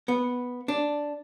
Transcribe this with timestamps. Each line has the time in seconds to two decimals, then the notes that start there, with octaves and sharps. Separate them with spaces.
0.08 B3
0.68 D4